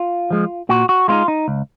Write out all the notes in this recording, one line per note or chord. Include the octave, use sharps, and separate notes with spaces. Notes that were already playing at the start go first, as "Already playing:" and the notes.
Already playing: F4
F3 G#3
A#2 F#4
F#4
G#3 C4 D#4 F4
D#4
C#2